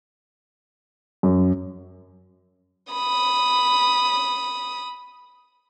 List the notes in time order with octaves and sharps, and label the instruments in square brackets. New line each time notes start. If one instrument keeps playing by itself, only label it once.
[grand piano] F#2
[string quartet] B5 D#6